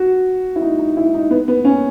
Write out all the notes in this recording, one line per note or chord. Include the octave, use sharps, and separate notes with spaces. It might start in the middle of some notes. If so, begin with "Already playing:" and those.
Already playing: F#4
E4
D#4
D#4
E4
D#4
B3
B3
C#4